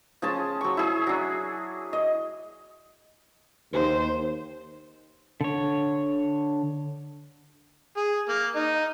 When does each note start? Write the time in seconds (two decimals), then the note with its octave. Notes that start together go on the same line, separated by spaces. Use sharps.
0.22 F3 C#4 G#4 A5
0.61 F#3 C#6
0.77 E4 G#4
1.07 F#3 D4
1.93 D#5
3.73 D#2 C5
5.41 D3 C#5
7.97 G#4
8.29 A#3
8.56 D#4